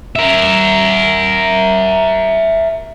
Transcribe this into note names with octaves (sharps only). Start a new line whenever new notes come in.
A#4 E5